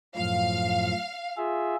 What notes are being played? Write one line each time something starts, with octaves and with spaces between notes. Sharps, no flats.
F#2 A2 F3 F5
F4 G#4 E5